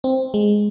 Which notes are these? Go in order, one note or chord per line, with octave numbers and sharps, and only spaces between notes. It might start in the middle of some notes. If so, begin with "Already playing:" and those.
C4
G#3